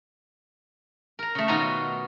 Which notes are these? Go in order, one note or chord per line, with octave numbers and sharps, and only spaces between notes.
A#4 A#5
C#3 A3
B2 D#3 D#4 F4 F#4 A#5